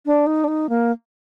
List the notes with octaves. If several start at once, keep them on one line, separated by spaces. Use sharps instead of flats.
D4
D#4
D4
D#4
A#3